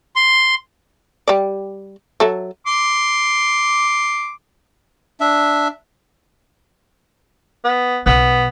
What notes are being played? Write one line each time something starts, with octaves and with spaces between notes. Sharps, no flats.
C6
G3 D5
F#3 A4 E5
C6 D6
D4 E5
B3
B1 B3